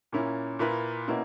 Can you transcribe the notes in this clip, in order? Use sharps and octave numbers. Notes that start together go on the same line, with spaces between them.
A#2 A#3 C#4 E4
A#2 A#3 E4 B4
B2 A#3 C#4 E4